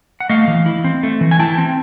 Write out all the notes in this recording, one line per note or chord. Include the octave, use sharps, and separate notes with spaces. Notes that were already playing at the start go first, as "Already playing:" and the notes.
F#5
A3 D#5 F5
E3
E4
C4
A3
E3
G#5
E4 G5 A5
C4